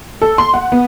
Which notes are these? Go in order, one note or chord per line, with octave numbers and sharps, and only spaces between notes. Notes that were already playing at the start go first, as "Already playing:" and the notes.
A4
C6
F#5
B3